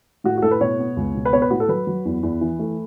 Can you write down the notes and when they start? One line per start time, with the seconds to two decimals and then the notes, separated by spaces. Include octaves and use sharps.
0.24 A2 F#4
0.38 F#4
0.42 A2 A4
0.51 B4
0.61 B2 C#5
0.79 B3
0.97 C#2
1.15 B2
1.25 B4
1.33 B3 C#5
1.42 B4
1.50 A2 F#4
1.60 A4
1.69 F#3 B4
1.87 F#3
2.05 E2
2.23 E2
2.41 E3
2.59 A3